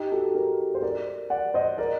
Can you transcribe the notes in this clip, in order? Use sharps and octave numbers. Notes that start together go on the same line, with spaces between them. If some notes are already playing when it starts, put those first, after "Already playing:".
Already playing: D#4 G4
F#4 A4
G4 A#4
C5
A#4 D5
D5 F#5
C5 D#5
A#4 D5